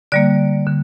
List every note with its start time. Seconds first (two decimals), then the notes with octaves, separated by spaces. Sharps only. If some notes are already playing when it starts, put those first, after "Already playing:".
0.12 D3 G3 A#3 D5
0.67 D3